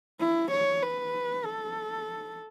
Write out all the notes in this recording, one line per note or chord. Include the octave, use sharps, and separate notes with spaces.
E4
C#5
B4
A4